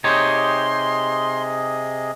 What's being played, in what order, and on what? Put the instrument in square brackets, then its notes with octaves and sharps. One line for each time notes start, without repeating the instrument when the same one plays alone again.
[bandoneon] C3 G#4 D#5 [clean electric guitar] D#4 G4 C#5 [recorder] C6